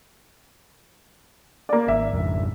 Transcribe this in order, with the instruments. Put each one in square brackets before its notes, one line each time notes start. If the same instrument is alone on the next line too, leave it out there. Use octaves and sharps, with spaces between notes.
[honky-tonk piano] A#3 D5
[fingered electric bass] G#1 [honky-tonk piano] E5
[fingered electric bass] G#1 F2